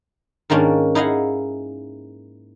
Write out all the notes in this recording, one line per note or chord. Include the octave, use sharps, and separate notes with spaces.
G#2 D#3 A#3 C#4 D4
D#4 E4 G#4 D#5 F5 F#5